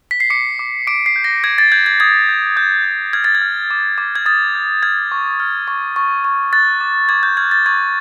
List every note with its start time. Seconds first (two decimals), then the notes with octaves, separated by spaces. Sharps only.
0.11 B6
0.20 C7
0.30 D6 C#7
0.59 D6
0.87 D6 D7
1.06 C7
1.16 G6
1.24 A#6
1.44 D6 G#6
1.58 A6
1.72 G6 G#6
1.86 G#6
2.00 D#6 G#6
2.29 G6
2.57 D#6 G6
2.85 G6
3.13 F6 G#6
3.24 A6
3.35 G#6
3.41 F6
3.71 D6
3.98 D6
4.16 G#6
4.26 D#6 A6
4.55 G6
4.83 F6 G#6
5.12 C#6
5.40 F6
5.68 C#6
5.96 C#6
6.24 C#6
6.53 F#6 A6
6.81 D6
7.09 D6 G#6
7.23 G6
7.37 F6 G#6
7.51 A6
7.66 C#6 G#6